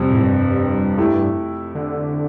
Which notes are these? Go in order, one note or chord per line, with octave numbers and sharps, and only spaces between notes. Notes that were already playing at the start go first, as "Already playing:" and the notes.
Already playing: F2 C3 G3 C4
A2
G2
A3 E4 G4
D3